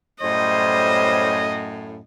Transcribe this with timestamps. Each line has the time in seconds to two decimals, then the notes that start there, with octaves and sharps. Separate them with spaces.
0.22 F#2 A2 G3 C5 D#5